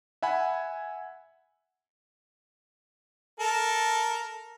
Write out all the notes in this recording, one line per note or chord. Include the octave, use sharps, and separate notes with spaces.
E5 F#5 G#5 B5
A4 A#4